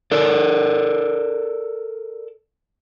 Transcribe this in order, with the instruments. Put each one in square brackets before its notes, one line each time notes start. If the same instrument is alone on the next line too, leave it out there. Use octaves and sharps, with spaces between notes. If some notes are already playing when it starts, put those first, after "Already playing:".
[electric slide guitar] A4 A#4 D5